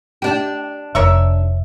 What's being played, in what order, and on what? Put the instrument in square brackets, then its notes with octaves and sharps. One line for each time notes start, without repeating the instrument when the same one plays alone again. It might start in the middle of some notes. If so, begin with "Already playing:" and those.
[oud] D4 G4
[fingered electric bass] F1 [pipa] A#4 C#5 E5